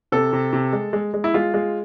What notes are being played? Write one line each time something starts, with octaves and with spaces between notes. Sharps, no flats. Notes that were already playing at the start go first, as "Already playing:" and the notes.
C3 A4
C3
C3
G#3
G#3
G#3
E4
G#3 F4
G#3